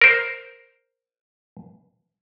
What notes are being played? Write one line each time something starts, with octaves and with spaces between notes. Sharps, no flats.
A#4 C5